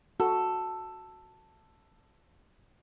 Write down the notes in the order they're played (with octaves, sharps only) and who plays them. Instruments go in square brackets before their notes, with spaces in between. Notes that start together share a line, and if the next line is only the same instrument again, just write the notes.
[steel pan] F#4 [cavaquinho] A4